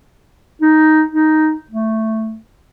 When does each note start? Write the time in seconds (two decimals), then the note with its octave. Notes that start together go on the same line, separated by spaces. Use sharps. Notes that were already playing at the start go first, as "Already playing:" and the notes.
0.62 D#4
1.12 D#4
1.71 A3